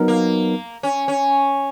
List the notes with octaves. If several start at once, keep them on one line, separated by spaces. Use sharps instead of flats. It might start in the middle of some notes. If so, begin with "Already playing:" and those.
Already playing: F#3 B3 D#4 A#4
A#3
C#4
C#4